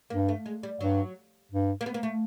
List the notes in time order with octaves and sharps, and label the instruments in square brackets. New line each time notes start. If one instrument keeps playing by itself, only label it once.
[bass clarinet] G2 [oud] A#3
[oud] A3
G#3
G3
[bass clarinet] G2 [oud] F#3
[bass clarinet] G2
[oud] A#3
B3
A#3
A3